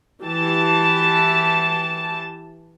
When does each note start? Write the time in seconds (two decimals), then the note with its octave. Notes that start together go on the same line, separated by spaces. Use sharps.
0.23 E3 G4 A5